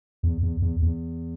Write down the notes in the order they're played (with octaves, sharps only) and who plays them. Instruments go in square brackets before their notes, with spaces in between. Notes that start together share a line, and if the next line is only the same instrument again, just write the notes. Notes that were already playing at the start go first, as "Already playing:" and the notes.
[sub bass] E2
E2
E2
E2